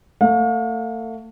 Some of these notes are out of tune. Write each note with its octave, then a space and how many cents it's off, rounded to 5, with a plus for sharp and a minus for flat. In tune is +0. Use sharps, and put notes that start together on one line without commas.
A3 +35 F5 +40